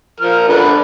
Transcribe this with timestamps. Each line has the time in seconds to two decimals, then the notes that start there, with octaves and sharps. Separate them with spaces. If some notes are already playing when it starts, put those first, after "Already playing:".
0.20 F3 A#4 F6
0.48 D3 B4